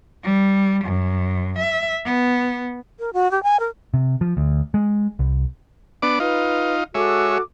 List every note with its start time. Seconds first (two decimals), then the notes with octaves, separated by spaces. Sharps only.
0.24 G3
0.85 F#2
1.59 E5
2.05 B3
2.99 A#4
3.13 F#4
3.31 G4
3.43 G#5
3.60 A#4
3.94 C3
4.21 F3
4.37 D2
4.74 G#3
5.19 C2
6.02 B3 D4 D6
6.20 D#4 F4 B4
6.95 G#3 F#4 A4 C#5 E5 D6